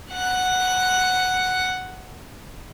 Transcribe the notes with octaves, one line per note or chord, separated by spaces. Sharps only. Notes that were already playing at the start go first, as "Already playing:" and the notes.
F#5 F#6